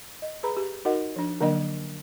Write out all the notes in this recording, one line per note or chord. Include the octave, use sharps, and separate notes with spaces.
D#5
G#4 B4 A#5 B5
G4
D#4 F#4 A#4 D#5 F#5
F3 D4
D3 F#3 A#3 D4 A#4 D#5